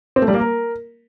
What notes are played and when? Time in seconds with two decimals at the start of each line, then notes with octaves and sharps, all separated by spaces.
0.16 C4
0.22 A3
0.28 G3
0.34 A#3
0.40 A#4